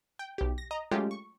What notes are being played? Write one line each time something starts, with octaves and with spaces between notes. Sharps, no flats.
G5
B1 G4
A#6
D#5 A#5
F#3 G#3 A3 C#4 F4 G4
C#6